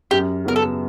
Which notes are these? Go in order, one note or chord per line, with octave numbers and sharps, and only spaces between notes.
F#2 G4
C#3 F#3 B3 A#4
A4